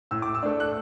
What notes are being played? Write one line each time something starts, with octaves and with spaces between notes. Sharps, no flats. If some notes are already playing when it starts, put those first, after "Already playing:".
A2 E6
D6
E6
A3 D4
F#6